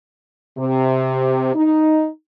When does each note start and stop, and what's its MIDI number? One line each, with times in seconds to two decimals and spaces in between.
0.58 1.52 48
1.55 2.08 63